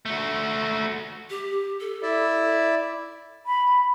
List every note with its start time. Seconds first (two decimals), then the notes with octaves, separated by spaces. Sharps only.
0.06 A3 F#4
1.30 G4
1.80 A4
2.03 E4 D5 E5
3.46 B5